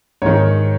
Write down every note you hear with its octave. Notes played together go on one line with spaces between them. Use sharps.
G#2 D#3 C#5